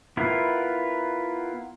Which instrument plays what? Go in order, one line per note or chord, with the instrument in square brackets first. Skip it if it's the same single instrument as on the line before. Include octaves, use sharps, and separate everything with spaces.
[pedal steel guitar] B3 E4 F4 A#4